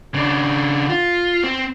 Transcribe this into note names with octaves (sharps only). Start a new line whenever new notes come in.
C#3 D4
F4
C4